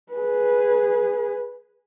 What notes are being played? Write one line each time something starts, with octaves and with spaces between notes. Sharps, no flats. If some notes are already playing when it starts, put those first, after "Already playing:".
G#4 B4